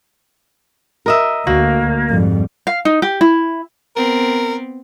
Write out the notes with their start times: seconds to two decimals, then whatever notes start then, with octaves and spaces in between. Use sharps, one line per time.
1.06 A#4 D#5 E5
1.47 D2 A#3 F#4
2.10 F2 G#2 G3
2.67 F5
2.85 D#4
3.02 G4
3.21 E4
3.96 B3 C4 A#4